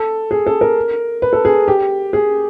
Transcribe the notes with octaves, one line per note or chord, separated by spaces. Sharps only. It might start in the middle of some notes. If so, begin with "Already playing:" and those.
Already playing: A4
G#4
A4
A#4
B4
A4
G#4
G4
G#4